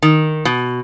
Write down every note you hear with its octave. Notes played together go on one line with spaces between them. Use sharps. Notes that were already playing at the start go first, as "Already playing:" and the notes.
D#3
B2